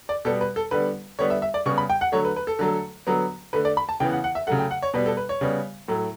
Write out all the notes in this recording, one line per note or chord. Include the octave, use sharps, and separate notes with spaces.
D5
B2 G3 B3 A4
B4
A4
D3 G3 B3 B4
D3 G3 B3 C#5
E5
E5
D5
C#3 G3 B3 C#6
B5
G5
F#5
D3 F#3 A3 C#5
B4
B4
A4
D3 F#3 A3
D3 F#3 B3
D3 A3 B4
D5
B5
A5
C#3 E3 B3 G5
F#5
F#5
E5
C#3 F#3 A3 F#5
G5
F#5
C#5
B2 G3 B3 B4
A4
B4
C#5
C#3 G3 B3
A2 F#3 A3